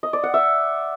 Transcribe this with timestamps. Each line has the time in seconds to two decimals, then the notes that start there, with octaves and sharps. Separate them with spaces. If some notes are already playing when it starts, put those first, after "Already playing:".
0.03 D#5
0.13 D5
0.23 F#5
0.34 E5